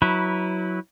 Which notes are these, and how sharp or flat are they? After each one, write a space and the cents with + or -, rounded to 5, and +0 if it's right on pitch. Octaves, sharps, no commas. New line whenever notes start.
F#3 +0 E4 -20 B4 +0